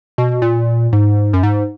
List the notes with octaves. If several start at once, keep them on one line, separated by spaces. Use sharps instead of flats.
B2
A#2
G#2
F#2
G#2